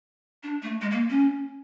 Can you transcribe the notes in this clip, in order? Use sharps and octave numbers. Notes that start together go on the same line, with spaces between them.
D4
A3
G#3
A#3
C#4